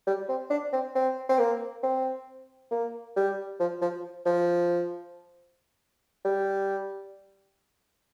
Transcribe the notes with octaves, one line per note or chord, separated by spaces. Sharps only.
G3
C4
D4
C4
C4
C4
A#3
C4
A#3
G3
F3
F3
F3
G3